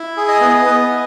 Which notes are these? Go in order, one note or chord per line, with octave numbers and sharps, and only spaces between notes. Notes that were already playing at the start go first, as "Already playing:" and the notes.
Already playing: E4
G#4
D#5
B3
B3
E4